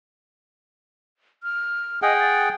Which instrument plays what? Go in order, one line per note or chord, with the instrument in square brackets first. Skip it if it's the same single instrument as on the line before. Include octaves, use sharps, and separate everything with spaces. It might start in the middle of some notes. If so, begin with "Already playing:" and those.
[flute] F6
[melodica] G#4 F#5 G5 [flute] D#5
[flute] A6